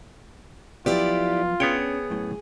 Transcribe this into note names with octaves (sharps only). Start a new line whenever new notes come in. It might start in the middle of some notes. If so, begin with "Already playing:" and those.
F3 F#3 B3 E4 F4 G4 D5
B3 C#4 D4 G#4 C#5 G5
F#2 A2